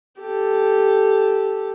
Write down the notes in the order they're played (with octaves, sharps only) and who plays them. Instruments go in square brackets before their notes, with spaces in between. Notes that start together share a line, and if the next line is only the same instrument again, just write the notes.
[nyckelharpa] G4 A4